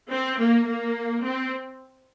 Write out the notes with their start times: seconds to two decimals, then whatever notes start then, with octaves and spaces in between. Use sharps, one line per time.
0.10 C4
0.38 A#3
0.66 A#3
1.23 C4